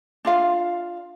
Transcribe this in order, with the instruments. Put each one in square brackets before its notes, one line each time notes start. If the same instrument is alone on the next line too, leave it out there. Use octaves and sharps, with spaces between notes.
[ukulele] D4 F4 F5